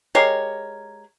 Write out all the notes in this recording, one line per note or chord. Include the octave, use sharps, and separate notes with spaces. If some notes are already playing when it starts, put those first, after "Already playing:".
G#3 G4 A#4 C#5